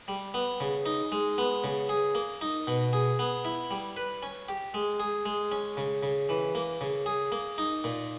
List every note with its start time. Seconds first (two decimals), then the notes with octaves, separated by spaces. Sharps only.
0.08 G3
0.34 B3
0.60 C#3
0.86 D#4
1.12 G#3
1.38 B3
1.64 C#3
1.89 G#4
2.15 A#3
2.41 D#4
2.67 B2
2.93 G#4
3.19 B3
3.45 E4
3.71 G3
3.97 B4
4.23 C#4
4.48 G4
4.74 G#3
5.00 G#4
5.26 G#3
5.52 C#4
5.77 C#3
6.03 C#3
6.29 E3
6.55 A#3
6.81 C#3
7.06 G#4
7.32 A#3
7.58 D#4
7.84 A#2